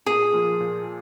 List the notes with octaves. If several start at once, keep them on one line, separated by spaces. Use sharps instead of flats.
A#2 G#4
F3 A#3 F4
A#2